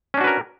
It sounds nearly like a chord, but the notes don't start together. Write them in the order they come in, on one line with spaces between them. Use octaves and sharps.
C#4 D4 F#4 B4 A#4